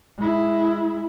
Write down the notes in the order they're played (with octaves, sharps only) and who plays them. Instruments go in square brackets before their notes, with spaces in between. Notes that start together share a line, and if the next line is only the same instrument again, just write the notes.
[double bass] G#3 E4